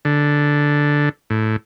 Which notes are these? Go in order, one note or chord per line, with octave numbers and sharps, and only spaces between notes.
D3
A2